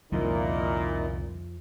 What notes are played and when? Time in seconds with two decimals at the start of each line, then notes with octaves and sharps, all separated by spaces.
0.12 C2 F2 A#2 D3 F3 A#3 D#4 E4